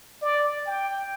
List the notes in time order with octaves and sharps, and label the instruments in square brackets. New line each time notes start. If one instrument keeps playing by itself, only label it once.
[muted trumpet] D5
G5